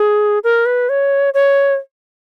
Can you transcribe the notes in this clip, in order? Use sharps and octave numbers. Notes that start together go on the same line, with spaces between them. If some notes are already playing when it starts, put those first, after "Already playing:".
Already playing: G#4
A#4
B4
C#5
C#5